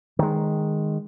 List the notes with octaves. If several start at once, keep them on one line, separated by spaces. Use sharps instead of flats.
D#3 G#3